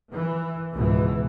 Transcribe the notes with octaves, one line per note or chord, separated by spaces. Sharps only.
E3
C#2 G#2 B2 E3